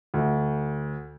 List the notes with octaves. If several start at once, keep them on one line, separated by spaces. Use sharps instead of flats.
D2